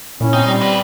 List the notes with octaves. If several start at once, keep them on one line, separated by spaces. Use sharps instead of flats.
A#2 C#4 E4
C4 D#4
G3
C3 B4